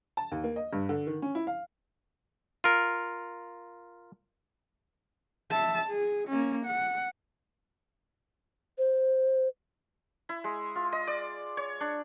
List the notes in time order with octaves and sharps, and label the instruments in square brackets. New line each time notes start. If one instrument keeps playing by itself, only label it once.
[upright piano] A5
D#2
A#3
D#5
G2
D3
D#3
C#4
E4
F5
[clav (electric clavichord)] F4 A#4
[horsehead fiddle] E5 A5
G#4
A#3 C#4
F#5
[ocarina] C5
[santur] E4
G#3
F4
D#5
D5
C#5
D4